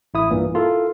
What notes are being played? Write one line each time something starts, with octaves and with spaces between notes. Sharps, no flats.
A1 E4 D#6
A#1 G2 A#2 E3 A#3
E4 F4 A4 A#4